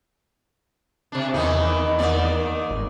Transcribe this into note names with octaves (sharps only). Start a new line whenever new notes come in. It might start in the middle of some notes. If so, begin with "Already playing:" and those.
C3 D4
E2 D#3 E3 D#4
D#3 A#3 D5
G#1